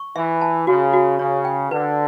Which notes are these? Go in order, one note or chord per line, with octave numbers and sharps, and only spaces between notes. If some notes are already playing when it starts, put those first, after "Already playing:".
Already playing: C#6
E3 E5
A5
C#3 F#4
F#4
C#3 C#5
G5
D3 B4